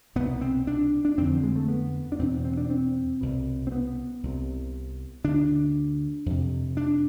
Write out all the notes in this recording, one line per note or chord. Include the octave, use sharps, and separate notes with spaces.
C2 B2 B3
C4
D4
D4
F2 D3 C4
F3
G#3
A3
B3
D4
E2 B2 C4
C4
D4
C4
C2 B2
C4
B3
C2 C3
D2 D3 D4
F2 C3
D4